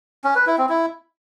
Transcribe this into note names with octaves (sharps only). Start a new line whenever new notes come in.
C#4
B4
E4
C4
E4